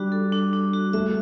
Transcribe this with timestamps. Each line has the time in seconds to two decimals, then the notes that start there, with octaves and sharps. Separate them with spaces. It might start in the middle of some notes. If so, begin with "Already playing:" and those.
Already playing: G3 D4 F#4
0.12 A4
0.32 D4
0.53 D4
0.73 F#4
0.93 A3 E5